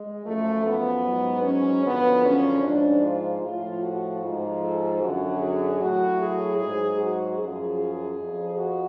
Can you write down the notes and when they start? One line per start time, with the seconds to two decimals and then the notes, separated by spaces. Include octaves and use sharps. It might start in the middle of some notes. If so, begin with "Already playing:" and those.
Already playing: G#3
0.25 F#2 F3 A3
0.65 B3
1.04 G#2 F#3
1.43 C#4
1.84 F#2 D3 F3 B3
2.23 C#4
2.63 G#2 F3 D4
3.02 F4
3.41 A2 F3 F4
3.82 F#4
4.21 G#2 F3
4.61 A4
5.00 F#2 D3 F#3 F#4
5.40 G#4
5.79 A2 F#3 F#4
6.20 G#4
6.58 G#2 G#4
6.64 F#3
6.99 F#4
7.38 F#2 F3 G#4
7.78 G#4
8.18 F2 F3
8.57 F#4